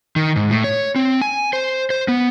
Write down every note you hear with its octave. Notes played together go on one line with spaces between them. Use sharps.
D#3
G#2
A2
C#5
C4
G#5
C5
C5
B3